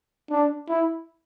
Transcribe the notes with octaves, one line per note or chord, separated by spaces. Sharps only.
D4
E4